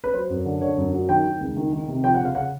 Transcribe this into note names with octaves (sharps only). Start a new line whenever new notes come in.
B4
F#3 C5
F#2
D3
D3 C#5
F#2
F#3
D#3 G5
D#3
C#2
D#3
D#3
C3
F3 G5
F#5
C#3 F5
C#3 F#5